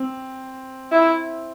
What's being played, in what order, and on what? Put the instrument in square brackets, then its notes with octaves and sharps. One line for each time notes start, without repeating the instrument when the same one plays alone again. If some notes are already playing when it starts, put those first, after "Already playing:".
Already playing: [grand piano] C4
[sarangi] E4